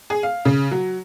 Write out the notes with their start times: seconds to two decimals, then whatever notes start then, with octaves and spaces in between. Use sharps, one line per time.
0.10 G#4
0.23 F5
0.45 C#3
0.71 F#3